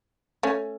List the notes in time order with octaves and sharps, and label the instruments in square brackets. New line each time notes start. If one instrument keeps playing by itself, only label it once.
[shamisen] A3 C#4